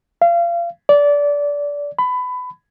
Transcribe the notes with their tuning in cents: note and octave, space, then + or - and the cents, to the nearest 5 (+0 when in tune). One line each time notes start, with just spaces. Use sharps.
F5 -30
D5 -20
B5 +20